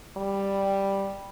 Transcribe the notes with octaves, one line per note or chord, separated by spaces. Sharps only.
G3